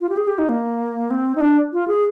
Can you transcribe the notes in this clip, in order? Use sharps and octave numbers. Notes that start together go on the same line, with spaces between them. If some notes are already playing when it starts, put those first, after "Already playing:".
F4
G4
G#4
G4
D#4
A#3
C4
D#4
D4
F4
G#4